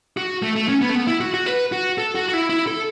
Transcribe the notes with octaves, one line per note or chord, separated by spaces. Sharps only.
F#4
A3
A3
C#4
B3
A3
B3
E4
F#4
F#4
B4
F#4
A4
F#4
F#4
E4
E4
A4